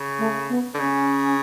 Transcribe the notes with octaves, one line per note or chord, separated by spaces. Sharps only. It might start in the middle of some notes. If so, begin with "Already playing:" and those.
Already playing: C#3
A3
B3
D3
C#3 C#4